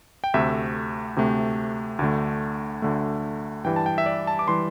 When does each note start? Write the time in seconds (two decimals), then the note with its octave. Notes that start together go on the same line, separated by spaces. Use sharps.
0.24 G5
0.34 D2 C3 A3 E5
1.16 D2 C3 A3
1.99 D2 D3 A3
2.82 D2 D3 A3
3.64 G2 E3 G3 G5
3.76 A5
3.86 G5
3.98 E5
4.06 D5
4.27 A5
4.39 D6
4.48 E3 G3 C6